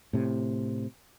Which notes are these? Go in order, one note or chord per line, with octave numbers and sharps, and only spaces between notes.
A2 C3